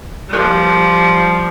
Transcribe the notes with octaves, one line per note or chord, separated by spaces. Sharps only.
F3 G3